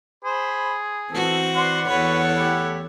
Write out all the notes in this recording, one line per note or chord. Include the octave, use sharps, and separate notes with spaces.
G#4 C5 B5
E3 B3 C4 F#4 A4
B4 D5 F#5 C6
E2 F#4 A4 B4 C#5
A3 E4 G4